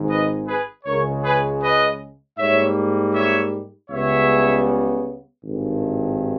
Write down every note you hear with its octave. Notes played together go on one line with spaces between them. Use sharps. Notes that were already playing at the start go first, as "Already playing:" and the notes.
Already playing: G#1 G#2 D#3
B4 D#5
G#4 B4
C#2 C#3 G#3 A#4 C#5
G#4 B4
B4 D#5
G#2 G3 A#3 C#5 E5
C#5 E5
C#2 C#3 G3 B3 C#5 E5
G#1 G2 D#3